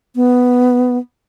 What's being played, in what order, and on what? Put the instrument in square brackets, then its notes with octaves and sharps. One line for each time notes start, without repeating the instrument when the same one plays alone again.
[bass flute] B3